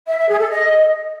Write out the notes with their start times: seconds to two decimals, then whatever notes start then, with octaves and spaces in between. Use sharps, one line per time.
0.07 E5
0.18 E5
0.28 G#4
0.39 A4
0.50 D#5